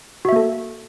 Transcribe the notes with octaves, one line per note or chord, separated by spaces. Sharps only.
A#3 F#4 A4 E5